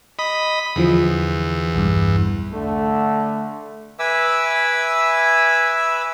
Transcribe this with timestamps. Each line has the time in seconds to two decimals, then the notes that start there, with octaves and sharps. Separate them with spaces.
0.19 D#5 B5
0.76 E2 D3 E3 F3
1.75 B1 G2
2.53 D3 A3
3.99 B4 E5 G#5 D6 E6